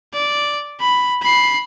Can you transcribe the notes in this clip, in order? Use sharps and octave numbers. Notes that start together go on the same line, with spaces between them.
D5
B5
B5 C7